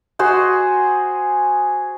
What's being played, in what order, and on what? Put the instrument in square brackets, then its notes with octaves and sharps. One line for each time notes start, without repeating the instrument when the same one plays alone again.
[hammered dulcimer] F#4 G#4 C5